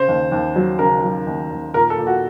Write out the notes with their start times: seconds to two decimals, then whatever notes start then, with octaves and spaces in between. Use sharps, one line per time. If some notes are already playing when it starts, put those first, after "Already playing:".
Already playing: C#3 C5
0.08 D#2
0.32 D#2
0.56 F#3
0.79 C#3 A#4
1.03 F#3
1.26 D#2
1.51 D#2
1.74 A#2 A#4
1.90 A4
1.98 A#2
2.07 F#4